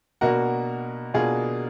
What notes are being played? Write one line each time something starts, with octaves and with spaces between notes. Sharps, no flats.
B2 A#3 D4 F#4 A#4
B2 A#3 D4 F4 G#4